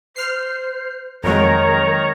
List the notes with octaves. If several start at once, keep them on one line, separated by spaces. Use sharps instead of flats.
C5 F6 C7
F2 D#3 F#3 G#3 A#4 C#5 A#5